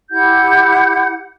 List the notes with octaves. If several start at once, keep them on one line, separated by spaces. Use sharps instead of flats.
E4 G4 F#5 G6